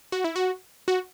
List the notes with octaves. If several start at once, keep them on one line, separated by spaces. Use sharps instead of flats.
F#4
E4
F#4
F#4